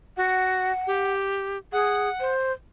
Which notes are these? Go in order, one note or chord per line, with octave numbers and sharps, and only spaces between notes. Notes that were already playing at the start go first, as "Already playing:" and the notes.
F#4 F#5
G4
G#4 F#5
C5